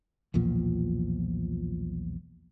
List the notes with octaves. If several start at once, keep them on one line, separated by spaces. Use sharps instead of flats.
B1 E2 A#2 F3